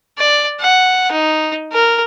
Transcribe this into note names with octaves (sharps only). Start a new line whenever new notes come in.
D5
F#5
D#4
A#4